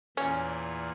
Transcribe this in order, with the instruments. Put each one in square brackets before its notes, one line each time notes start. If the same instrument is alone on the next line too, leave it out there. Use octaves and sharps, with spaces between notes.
[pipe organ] E2 A#2 [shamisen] C#4